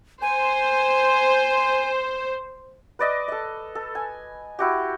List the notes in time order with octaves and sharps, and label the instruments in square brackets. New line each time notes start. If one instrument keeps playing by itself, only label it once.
[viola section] C5 [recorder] G#5
[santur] B4 D5 D#5 D6
A4 D#5
A4
G#5
E4 F#4 G4